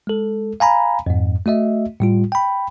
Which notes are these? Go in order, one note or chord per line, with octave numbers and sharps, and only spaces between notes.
G#3 A4
F5 G#5 A#5 B5
F2 G#2
A3 F#4 D#5 E5
A2 G3 F4
G5 B5